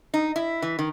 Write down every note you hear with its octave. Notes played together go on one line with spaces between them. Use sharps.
D#4
E4
E3
D#3